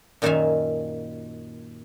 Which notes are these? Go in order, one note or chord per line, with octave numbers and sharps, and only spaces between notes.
F#2 A#2 D#3 E5 F5 G#5